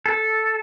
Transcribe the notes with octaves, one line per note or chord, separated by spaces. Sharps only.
A4